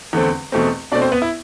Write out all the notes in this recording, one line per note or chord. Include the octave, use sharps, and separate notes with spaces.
E2 D3 A3 C4
E2 B2 A3 C4
B2 A3 C4 D4 D5
C4 C5
B3 B4
E4